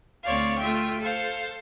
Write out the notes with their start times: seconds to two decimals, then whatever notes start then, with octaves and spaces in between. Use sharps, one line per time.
0.23 D2 C4 C#5 D5 F5
0.58 A3 F4 E5 G5
1.00 A4 C5 F5